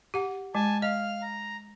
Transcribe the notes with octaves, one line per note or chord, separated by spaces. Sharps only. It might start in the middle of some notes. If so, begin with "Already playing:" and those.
G4 F#5
G#3 G#5 A5
D#5 F5 F6
A#5